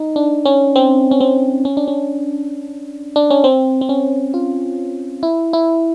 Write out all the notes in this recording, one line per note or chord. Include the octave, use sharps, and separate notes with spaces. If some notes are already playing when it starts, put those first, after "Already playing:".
Already playing: D#4
D4
C#4
C4
C#4
C4
C#4
D4
C#4
D4
C#4
C4
C4
C#4
F4
E4
E4